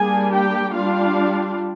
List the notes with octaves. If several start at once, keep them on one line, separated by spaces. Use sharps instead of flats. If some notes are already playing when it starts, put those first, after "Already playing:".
Already playing: G3 A#3 D4 G#4 G#5
G4 G5
G3 D4 F4 F5